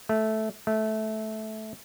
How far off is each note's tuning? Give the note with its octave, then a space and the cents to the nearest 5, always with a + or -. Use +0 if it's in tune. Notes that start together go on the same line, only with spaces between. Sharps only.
A3 -10
A3 -15